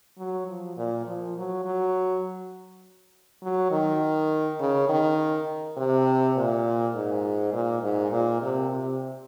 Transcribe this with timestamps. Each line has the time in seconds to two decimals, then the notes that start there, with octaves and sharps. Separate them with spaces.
0.18 F#3
0.47 F3
0.77 A#2
1.06 F3
1.37 F#3
1.65 F#3
3.43 F#3
3.71 D#3
4.60 C#3
4.89 D#3
5.78 C3
6.36 A#2
6.95 G#2
7.53 A#2
7.82 G#2
8.12 A#2
8.42 C3
8.72 C3